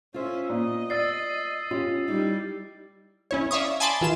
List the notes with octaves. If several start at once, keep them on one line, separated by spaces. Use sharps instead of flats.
C#4 F4 C5 E5
A#2 D#5
D5 E6 A6 C7
C#4 F4 G4
G3 D#4 E4
C#4 E4 C#5
D5 E5 F5 C#6 D#6
G#5 A5 B5 C6 D6 A6
E3 F4 E7